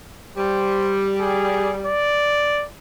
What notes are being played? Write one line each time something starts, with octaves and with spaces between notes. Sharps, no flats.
G3 C5
G#4
D5